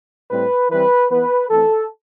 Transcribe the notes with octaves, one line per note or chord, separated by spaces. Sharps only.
A2 G3 C4 B4
E3 G3 C4 B4
E3 B3 B4
E3 A3 C4 A4